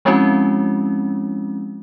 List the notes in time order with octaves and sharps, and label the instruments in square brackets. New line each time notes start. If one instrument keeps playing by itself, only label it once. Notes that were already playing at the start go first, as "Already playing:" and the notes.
[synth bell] F3 G#3 C4 C#4 E4 F#4